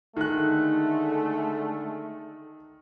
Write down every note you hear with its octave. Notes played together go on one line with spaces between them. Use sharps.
D3 D#3 G#3 A3 F#6